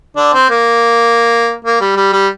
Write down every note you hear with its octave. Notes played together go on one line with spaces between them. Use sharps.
D3 D4
C4
A#3
A#3
G3
G3
G3